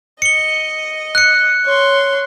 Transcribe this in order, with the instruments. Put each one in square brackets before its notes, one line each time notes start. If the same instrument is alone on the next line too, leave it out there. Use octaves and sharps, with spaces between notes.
[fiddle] D#5 [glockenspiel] C#7 G7
[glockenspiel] F#6 C#7
[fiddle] C#5 C6